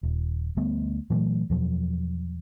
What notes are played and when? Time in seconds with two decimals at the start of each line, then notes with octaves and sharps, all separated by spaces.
0.03 D#1
0.57 D2 G3 A3 B3
1.10 A#2 E3 F#3 A3
1.50 E2 B2 F3 F#3